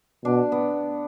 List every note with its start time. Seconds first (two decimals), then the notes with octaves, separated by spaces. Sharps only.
0.25 B2 D4
0.52 B3